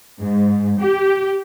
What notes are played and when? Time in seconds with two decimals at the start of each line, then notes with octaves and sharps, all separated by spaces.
0.20 G#2
0.79 G4